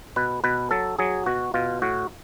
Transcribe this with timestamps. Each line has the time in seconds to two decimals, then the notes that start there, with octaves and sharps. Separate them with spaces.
0.16 B2 B4
0.44 B2 B4
0.71 F#3 A4
0.99 F#3 G#4
1.26 B2 F#4
1.54 B2 F4
1.82 A2 F#4